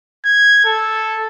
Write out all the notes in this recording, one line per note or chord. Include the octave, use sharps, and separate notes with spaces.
G#6
A4